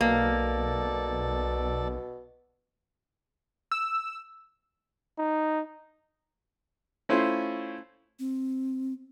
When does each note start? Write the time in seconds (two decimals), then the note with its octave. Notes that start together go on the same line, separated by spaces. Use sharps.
0.01 B1 B2 A#3 A4 D5
3.72 E6
5.18 D#4
7.09 A3 C#4 E4 F4 C5
8.19 C4